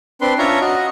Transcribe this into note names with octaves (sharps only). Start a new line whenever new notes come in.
C4 D4 B4 C6
C#4 D4 F4 C#5 E5 A#5
F#4 D#5